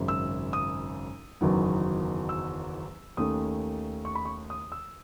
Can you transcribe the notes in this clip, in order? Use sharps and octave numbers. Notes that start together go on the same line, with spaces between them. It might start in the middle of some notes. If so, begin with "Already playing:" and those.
Already playing: G#1 F#2 C#3
E6
D#6
F#1 E2 D#3 F#3 B3
E6
D#2 D#3 A3 C#4 D#6
C#6
B5
C#6
D#6
E6